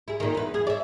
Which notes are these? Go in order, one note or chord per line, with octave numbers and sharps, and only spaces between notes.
E4 G#4
A#2 D#3
E2 B4
G#4
D5 E5